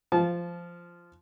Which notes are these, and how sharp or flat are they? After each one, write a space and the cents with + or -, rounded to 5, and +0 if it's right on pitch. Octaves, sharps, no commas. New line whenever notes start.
F3 -10 A5 -30